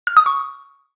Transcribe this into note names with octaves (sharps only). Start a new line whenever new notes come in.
F6
D#6
C#6